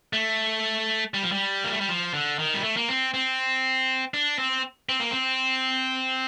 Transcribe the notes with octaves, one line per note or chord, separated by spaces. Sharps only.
A3
G3
F3
G3
A#3
A3
G3
F3
D3
D#3
G3
A3
A#3
C4
C4
D4
C4
C4
A#3
C4